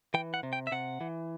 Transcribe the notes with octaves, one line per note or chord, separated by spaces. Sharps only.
E3 G5
F#5
C3
G5
E5
C3 F#5
E3